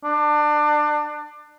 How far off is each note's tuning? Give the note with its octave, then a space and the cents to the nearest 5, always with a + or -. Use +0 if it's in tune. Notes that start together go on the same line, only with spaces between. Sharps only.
D4 +25